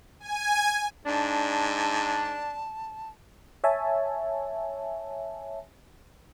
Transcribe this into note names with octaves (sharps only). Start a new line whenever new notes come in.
G#5
G#2 D4 A5
C#5 E5 G#5 A5